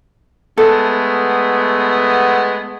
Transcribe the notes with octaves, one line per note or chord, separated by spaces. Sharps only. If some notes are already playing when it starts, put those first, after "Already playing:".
G#3 A3 B3 A4